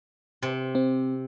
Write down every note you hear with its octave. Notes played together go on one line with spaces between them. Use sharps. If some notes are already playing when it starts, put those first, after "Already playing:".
C3
C4